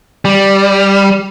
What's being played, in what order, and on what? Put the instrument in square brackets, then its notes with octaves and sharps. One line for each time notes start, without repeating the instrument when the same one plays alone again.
[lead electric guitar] G3